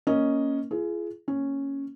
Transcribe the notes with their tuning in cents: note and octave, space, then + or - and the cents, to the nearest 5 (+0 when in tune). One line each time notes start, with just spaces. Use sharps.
A#3 +0 C#4 +0 D#5 +0
F4 -35 G#4 +20
A#3 -15 C#4 -5